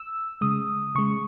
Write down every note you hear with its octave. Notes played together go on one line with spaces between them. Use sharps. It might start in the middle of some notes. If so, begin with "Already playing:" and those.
Already playing: E6
C#3 G#3 D#6
C#3 G#3 C#6